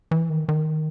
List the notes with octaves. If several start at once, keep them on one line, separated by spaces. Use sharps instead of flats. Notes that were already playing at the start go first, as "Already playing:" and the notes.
E3
D#3
D#3